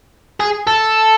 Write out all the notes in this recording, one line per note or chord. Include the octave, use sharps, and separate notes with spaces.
G#4
A4